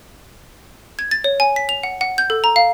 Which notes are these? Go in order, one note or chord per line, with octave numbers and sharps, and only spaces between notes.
G#6
A6
C#5
G#5
B6
F7
F#5
F#5
G6
A4
A#5
F5